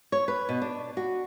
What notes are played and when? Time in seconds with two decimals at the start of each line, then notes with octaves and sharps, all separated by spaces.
0.12 C#5
0.28 B4
0.49 B2
0.62 D4
0.97 F#4